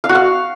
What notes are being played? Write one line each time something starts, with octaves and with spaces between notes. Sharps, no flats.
F5
F#4
F5